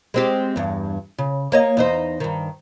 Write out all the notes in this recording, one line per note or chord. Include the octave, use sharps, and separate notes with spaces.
G#3 C4 G4
E2 G2
C#3
A#3 C#5 D#5
E2 D#4 C5
G2 D#3